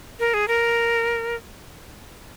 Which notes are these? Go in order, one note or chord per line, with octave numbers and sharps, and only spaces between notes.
A#4
G#4
A#4